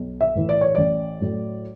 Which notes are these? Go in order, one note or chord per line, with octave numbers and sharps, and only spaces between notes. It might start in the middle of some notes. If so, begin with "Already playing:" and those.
Already playing: B1
E5
A2 E3
D5
C#5
A1 D5
A2 F#3 A3